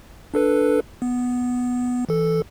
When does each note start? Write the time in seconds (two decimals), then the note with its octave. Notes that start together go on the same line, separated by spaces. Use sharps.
0.34 D4 A4 B4
1.02 B3
2.09 E3 A4